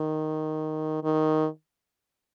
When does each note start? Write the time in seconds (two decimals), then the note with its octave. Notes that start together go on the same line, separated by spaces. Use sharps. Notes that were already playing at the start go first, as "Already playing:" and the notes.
Already playing: D#3
1.04 D#3